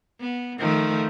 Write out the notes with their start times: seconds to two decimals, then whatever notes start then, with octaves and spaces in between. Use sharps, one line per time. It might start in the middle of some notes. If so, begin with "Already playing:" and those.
0.20 B3
0.58 D#3 F3 A3